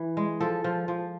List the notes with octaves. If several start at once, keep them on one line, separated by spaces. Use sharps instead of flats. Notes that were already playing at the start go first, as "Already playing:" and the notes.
Already playing: E3
G#3
F3 A4
F3
F3